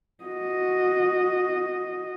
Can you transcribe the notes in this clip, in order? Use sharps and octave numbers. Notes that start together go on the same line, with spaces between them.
F#4 D#5